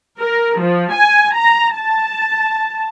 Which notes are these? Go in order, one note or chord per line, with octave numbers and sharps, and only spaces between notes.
A#4
F3
G#5
A#5
A5